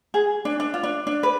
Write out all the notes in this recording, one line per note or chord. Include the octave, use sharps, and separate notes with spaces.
G#4
D4
D4
F4
D4
D4
B4